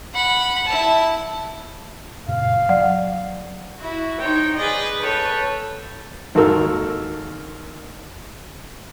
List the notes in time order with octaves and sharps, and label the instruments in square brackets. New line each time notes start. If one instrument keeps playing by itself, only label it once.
[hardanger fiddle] F#5 B5
E4 A5
[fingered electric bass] F#2 A#2 C#3 [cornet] F5
[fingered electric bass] F#3 [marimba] D5 [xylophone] F#5
[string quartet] E4 F#4
D#4 C5 C#5 G5
G#4 B4 D5 D#5
A4 B4 C#5 G5
[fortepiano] G#1 D#2 F#4 A4 A#4 E6